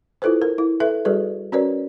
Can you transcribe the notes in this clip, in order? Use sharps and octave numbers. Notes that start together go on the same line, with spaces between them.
E4 F4 A4 B4 C5
A#4
E4
A4 B4 E5
G3 F#4 G#4 A4 B4 D5
C#4 F#4 A#4 B4 C#5 D5